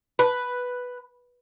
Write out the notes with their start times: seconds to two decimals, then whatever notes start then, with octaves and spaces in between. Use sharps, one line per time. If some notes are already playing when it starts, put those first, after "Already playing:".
0.19 B4